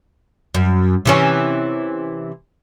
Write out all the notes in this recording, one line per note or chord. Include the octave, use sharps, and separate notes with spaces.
F#2
C3 E3 C#4